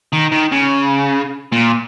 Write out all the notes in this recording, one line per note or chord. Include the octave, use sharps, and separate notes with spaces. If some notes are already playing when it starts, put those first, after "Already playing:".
D#3
D#3
C#3
A#2